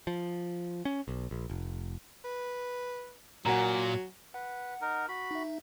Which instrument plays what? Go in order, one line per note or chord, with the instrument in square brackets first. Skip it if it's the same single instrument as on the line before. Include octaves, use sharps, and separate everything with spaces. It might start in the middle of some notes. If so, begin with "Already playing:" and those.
[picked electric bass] F3
C#4
B1
A#1
F1
[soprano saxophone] B4
[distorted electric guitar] A#2 [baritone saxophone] F#3 [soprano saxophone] A#4 [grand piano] F#5 G#5 A#5
[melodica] B4 [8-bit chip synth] F#5
[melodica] D#4 A#4
F#4 B5
[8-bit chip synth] D#4 E5